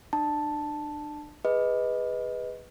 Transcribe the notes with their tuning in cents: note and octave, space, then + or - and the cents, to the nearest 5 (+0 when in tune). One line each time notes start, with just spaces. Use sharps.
D4 +35 A5 +0
G#4 -15 B4 +0 D#5 +15